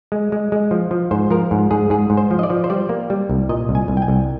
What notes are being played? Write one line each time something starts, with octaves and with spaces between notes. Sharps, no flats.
G#3
G#3
G#3
F3
F3
G#2 C5
F3 A#4
G#2
G#2 G#4
G#2 G#4
G#2
C5
F3
D#5
D5
F3
C5
G3 D5
A#3
G3
C2
A#2 D#5
C2
G#5
C2
G5
G#5
C2